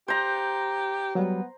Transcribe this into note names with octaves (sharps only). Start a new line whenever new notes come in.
G4 C5 A#5
F#3 G3 B3